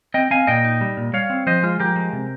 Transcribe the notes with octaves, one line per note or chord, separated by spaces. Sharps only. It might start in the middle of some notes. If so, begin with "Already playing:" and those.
C4 D#5 G5
C4 F5 G#5
A#2 D#5 G5
D#4
G3
A#2
G3 C#5 F5
C4
F3 C5 D#5
G#3 F4
F3 G4 A#4
G#3
C3